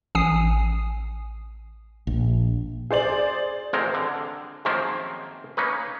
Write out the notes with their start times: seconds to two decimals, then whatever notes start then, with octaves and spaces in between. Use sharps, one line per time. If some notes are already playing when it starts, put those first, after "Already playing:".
0.15 A1 G#5 D#6 C7
2.07 A#1
2.91 G#4 C5 D5 F#7
3.73 A1 F2 C3 G#3 C4 A#4
3.94 D3
4.65 F#2 D#3 F3 G#3 A#3 C4
5.57 A#3 C#4 D#4 B4